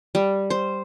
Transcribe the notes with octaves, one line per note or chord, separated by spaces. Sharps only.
G3
C5